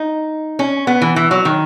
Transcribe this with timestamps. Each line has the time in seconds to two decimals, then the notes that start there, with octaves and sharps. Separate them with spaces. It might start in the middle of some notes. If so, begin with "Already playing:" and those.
Already playing: D#4
0.59 C#4
0.87 B3
1.01 E3
1.16 E3
1.31 F#3
1.45 D#3